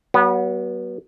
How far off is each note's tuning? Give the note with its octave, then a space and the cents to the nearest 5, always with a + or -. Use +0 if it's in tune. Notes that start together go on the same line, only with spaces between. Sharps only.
F#3 +35 B3 -25